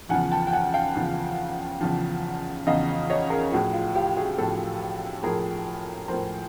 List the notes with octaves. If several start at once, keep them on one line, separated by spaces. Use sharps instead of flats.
E2 C#3 F3 F#5 G#5
G5 A5
G5
F#5 G#5
F5 G5
E2 C#3 F3
E2 C#3 F3
E2 C#3 F3 D#5 F5
C#5 D#5
G#4 A#4
A2 F3 F#4 G#4
F4
F4 G4
F#4 G#4
A2 F3 G4 A4
A2 F3 G#4 A#4
A2 F3 A#4 C5